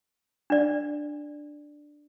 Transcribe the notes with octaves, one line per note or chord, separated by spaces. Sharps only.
D4 D5